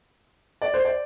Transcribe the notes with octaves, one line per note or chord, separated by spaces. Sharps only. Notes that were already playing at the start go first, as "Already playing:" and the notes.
D5
C5
D5